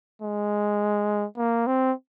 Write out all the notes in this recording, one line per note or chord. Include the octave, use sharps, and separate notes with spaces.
G#3
A#3
C4